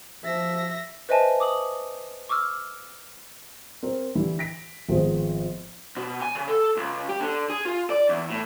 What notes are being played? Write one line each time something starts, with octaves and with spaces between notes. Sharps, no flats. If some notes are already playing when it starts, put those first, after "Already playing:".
F3 E5 A#6
B4 C5 D#5 E5 G#5 A5
D6 D#6 F#7
C#6 D6 E6 F6
C4 A#4
D3 E3 E4 G4
A#6 B6 D7
G#1 F3 B3 G#4 C5
B2
G#5
C#3
A4
C#2
G4
D3
G#4
F4
D5
E2
A2